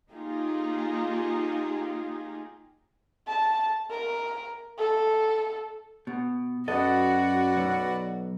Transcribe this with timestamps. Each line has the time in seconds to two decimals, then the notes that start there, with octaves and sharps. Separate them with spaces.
0.12 A#3 D#4 F4 G4 G#4
3.27 A5
3.91 A#4
4.78 A4
6.07 B2
6.68 F#2 F#4 A4 B4 D5 D#5 F#5
7.57 B1